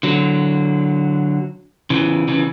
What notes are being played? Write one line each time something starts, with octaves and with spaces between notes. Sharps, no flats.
D3 F#3
C#3 E3
C#3 E3